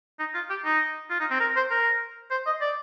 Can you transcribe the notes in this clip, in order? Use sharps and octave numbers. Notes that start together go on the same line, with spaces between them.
D#4
F4
G4
D#4
F4
D#4
C4
A#4
C5
A#4
C5
D#5
D5